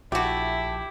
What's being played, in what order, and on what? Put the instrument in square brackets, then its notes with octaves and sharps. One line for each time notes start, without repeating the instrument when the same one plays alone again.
[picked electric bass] A#1 [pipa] A3 F#4 [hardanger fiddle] E4 [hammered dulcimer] G4